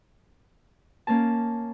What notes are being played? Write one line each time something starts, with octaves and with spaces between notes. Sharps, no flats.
A#3 C#4 A#4 A5